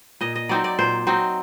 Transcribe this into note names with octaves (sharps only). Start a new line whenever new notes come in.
A#2 D#5
D#5
F#3 C4 D#4 D5
D5
A#2 C5
F#3 C4 D#4